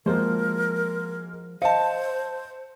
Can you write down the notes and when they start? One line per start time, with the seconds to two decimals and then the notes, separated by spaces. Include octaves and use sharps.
0.06 F3 G#3 A#3 F#4 A#4 C5
1.62 C5 D#5 F5 A5 C#7